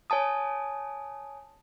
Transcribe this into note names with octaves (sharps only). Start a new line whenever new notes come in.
C#5 G#5 A5 D#6